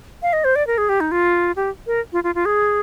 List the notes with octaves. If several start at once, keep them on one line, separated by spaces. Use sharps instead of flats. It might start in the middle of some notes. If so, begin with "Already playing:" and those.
F5
D#5
C5
D5
A#4
G#4
G4
D#4
F4
G4
A#4
F4
F4
F4
G#4